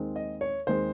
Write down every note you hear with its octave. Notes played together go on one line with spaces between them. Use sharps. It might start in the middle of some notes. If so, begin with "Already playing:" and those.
Already playing: D#2 D#3 G#3 C4
D#5
C#5
D#2 D#3 G#3 C4 C5